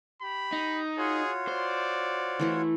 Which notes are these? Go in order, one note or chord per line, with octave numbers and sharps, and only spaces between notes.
G4 B5
D#4
F4 F#4 G#4 C#5
C5 D5
E3 A3 E4